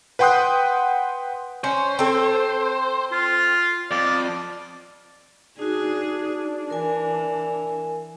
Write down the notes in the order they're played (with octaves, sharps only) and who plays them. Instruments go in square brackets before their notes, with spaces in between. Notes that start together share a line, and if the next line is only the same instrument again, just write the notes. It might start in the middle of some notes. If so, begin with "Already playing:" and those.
[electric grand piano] B4 F#5 G5 C6 D#6 F#6
[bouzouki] C#4 [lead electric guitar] C5
[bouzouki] C4 A4
[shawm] F4
[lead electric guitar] F2 [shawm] D5
[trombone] D4 [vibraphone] D#4 F#4 [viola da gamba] G#4
[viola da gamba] E3 [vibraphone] A#4 G#5